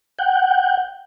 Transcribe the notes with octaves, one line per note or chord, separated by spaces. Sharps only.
F#5 G5